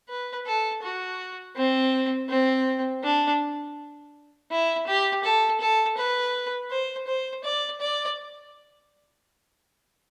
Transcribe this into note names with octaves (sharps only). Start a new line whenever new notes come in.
B4
A4
F#4
C4
C4
D4
E4
G4
A4
A4
B4
C5
C5
D5
D5